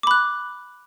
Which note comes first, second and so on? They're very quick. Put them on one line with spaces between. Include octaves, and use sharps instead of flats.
D6 B5 F#6